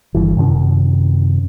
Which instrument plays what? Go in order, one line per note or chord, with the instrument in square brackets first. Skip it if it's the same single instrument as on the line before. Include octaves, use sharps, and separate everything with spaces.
[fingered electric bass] G1 G2 E3
F#2 C3 D#3 C#4